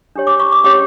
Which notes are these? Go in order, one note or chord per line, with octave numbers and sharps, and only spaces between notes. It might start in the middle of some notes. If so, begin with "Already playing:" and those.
D4 G4 C#5
D6
C#6
D6
C#4 G4 C#5 D6